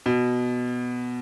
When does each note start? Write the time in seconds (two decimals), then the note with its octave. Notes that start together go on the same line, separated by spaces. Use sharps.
0.06 B2